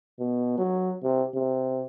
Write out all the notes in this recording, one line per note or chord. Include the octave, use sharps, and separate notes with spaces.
B2
F#3
C3
C3